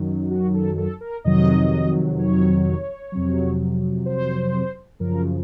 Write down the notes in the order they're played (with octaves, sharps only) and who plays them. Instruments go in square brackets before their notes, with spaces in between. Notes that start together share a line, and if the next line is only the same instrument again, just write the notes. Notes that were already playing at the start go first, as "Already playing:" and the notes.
Already playing: [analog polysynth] F#2 D#3 F#3
F#4
A4
A4
A#4
F2 C3 D#3 F#3 D#5
C#5
F2 C3 F#3
C5
F#2 C#3 F3 A#4